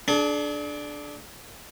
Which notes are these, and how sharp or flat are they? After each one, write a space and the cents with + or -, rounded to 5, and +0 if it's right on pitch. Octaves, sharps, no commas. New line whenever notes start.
D4 +0 G#4 +45